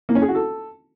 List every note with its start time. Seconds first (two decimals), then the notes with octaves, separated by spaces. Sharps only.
0.09 A#3
0.15 C#4
0.22 G#4
0.28 F#4
0.35 A4